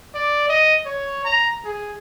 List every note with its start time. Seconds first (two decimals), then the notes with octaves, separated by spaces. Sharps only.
0.14 D5
0.49 D#5
0.85 C#5
1.24 A#5
1.65 G#4